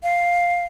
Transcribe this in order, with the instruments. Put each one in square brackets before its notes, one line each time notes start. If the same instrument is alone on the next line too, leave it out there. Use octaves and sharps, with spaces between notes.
[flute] F5